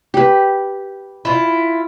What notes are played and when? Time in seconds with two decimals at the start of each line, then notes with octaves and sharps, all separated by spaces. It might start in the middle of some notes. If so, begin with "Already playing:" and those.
0.14 G4 B4
1.25 E4 F4